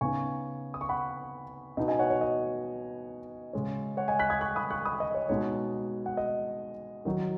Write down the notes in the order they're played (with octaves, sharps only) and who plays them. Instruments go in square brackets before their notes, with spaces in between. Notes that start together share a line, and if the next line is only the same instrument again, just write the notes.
[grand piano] C#3 B3 D#4 G#5 C#6
D#6
C#6
F#5 B5
B2 B3 D#4 D#5
D#5 G#5
C#5 F#5
C#5
D#5
C#3 G#3 C#4
C#5 F#5
D#5 G#5
F#6 B6
D#6 G#6
C#6 F#6
B5 D#6
C#6 F#6
B5 D#6
D#5
C#5
B2 G#3 D#4 C#5
F#5
D#5
D#3 F#3 D#4